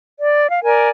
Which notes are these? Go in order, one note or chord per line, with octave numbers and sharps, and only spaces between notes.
D5
F5
A#4 D5 G#5